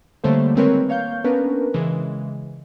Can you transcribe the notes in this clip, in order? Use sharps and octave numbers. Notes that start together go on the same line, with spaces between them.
D3 G3 A3 A#3 C5 C#5
D#3 G#3 C4 A#4 B4 C#5
A#3 C#5 F5 G6
B3 C#4 D4 A#4 B4
C#3 E3 G#3